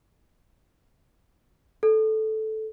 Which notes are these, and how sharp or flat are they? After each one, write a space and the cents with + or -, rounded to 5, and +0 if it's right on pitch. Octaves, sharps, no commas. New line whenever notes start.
A4 -10